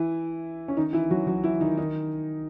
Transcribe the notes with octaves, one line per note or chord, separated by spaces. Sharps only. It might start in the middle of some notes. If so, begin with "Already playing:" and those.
Already playing: E3 E4
C#4
D#3 D#4
E3 E4
F#3 F#4
F#3 F#4
E3 E4
D#3 D#4
D#3 D#4